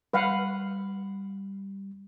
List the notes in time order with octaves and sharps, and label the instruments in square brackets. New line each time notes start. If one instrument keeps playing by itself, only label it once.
[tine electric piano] G3 [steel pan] B4 F5 F#5